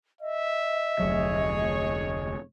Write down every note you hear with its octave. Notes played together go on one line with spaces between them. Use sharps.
D#5 E5
F1 D2 F#3 G#4 C#5